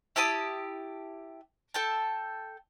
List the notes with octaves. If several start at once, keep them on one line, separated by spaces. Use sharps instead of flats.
E4 G4 A5 D#6
A4 G5 A5